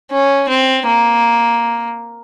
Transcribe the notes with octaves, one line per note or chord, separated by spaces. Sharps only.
C#4
C4
A#3